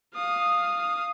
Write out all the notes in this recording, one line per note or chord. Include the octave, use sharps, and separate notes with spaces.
F5 D#6